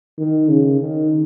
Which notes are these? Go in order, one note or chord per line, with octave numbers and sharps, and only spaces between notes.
D#3
C#3
D#3